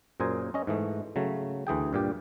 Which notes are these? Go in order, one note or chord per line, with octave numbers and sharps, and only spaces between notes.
F#2 A#2 G#4 C5 G#5 A#5
C#4 D#5
G#2 E3 A3
C#3 F#3 A3
D2 E3 G#4 G5
G2 A#2 G4